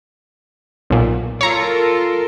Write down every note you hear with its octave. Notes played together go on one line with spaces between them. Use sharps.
B1 A#2
F4 A4 A#4 C#5 A#5